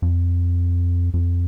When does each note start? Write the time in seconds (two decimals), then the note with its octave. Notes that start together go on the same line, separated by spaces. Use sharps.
0.02 F2
1.14 F2